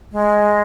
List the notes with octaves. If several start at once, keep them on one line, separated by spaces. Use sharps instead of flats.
G#3